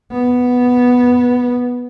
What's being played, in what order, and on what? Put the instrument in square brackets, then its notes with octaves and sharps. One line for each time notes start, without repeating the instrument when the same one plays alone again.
[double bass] B3